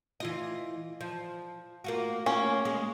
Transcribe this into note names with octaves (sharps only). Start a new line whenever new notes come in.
E3 F4 D#5
F3
A#3 F4 F#4
A#3 C#4
G#3